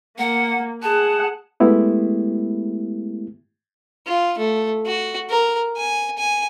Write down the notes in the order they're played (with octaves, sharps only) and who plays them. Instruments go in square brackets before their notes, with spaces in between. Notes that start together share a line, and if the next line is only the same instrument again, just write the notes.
[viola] A#3 [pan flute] F#5
[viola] G#4 F#5 [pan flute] A5
[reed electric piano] G#3 A3 B3 E4 G4
[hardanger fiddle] F4
A3
F#4
A#4
G#5
G#5